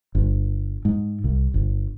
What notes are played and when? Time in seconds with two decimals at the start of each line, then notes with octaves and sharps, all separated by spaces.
0.15 G1
0.85 G#2
1.24 C2
1.54 G1